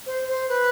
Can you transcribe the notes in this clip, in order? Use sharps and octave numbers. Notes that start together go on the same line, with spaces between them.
C5
C5
B4